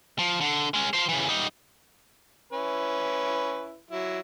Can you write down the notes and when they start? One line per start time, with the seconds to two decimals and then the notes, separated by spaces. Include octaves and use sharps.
0.19 F3
0.41 D3
0.74 G#3 C#4
0.93 F3 C5
1.09 C#3 E3
1.29 G3 D#4
2.53 C#4 E4 B4
3.91 F#3 E4